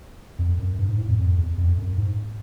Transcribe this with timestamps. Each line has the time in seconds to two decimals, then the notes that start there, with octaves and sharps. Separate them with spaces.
0.39 F2
0.59 F#2
0.79 G2
0.89 G#2
0.98 A2
1.08 F2
1.18 F2
1.38 E2
1.58 F2
1.78 F#2
1.97 G#2